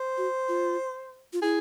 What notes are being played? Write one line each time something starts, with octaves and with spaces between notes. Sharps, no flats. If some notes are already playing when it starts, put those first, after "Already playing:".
Already playing: C5
F#4
F4
F4
E4 G#4